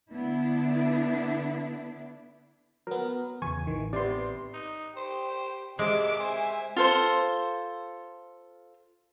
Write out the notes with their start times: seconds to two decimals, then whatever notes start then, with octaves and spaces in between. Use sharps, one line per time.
0.11 D3 B3 D4 E4
2.87 F#3 B3 A#4
3.42 E2 C#3 E3 G#5 C#6
3.67 A1 D#3 E3
3.93 C3 B3 D5 C6
4.54 D#4
4.97 G4 C5
5.79 C3 G#3 D6
6.20 C5 E5 G#5
6.76 F4 A4 C5